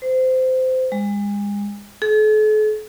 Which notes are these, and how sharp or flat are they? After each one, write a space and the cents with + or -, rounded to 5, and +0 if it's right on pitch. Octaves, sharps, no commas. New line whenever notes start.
C5 -20
G#3 -35
A4 -45